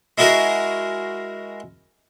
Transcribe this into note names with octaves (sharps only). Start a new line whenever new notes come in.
G#3 E4 F#4 G#4 A#4